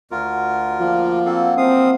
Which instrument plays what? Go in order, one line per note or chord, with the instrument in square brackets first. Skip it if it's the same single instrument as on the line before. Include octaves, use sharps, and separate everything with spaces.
[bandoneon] D2 F4 A#4 [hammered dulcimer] F#4
[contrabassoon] F3 [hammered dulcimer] A#3 D4
[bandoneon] A#3 C4 A4 [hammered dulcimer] F#4 F5 F#5
[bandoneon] F3 F5 D#6 [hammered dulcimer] F#3 E4 [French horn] C4